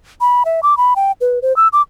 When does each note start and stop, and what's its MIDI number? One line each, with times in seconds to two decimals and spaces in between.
0.21 0.43 83
0.45 0.60 76
0.63 0.77 86
0.77 0.94 83
0.96 1.12 79
1.21 1.39 71
1.42 1.55 72
1.56 1.68 88
1.73 1.82 86